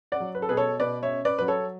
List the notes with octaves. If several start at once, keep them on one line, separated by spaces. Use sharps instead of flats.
D5 F#5
F#3
B4
A4
B2 G#4 B4
A4 C#5
B2 B4 D5
C#5 E5
C#4
B4 D5
F#3 B4
A4 C#5